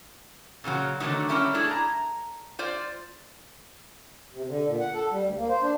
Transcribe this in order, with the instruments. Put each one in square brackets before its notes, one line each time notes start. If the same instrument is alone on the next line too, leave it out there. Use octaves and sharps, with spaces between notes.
[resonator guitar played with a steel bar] A#2 C#3 F3 F#3
D3 D#3 F3 F#3 A3 D#4
G3 A#3 C#4 E4 G4
A3 D4 E4 G#4 D5
A#5
F4 C5 D5
[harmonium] C3
D3
A#2
F#5
A4
G3
D2
A#3
C5
D4